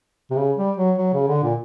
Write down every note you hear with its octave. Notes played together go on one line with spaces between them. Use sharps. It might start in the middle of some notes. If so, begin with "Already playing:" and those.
C3
C#3
G3
F#3
F#3
C#3
D3
A#2